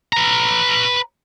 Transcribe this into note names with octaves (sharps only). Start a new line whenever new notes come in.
B4 A#5